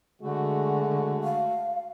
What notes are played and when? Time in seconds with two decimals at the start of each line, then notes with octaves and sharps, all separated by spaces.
0.22 D3 G#3 A3 F#4
1.24 F5